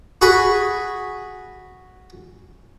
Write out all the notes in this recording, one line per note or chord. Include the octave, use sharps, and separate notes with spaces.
F#4 G#4 B5